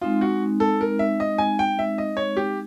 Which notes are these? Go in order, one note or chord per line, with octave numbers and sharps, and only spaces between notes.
G#3 C4 D#4 F4
F#4
A4
A#4
E5
D#5
G#5
G5
E5
D#5
C#5
G4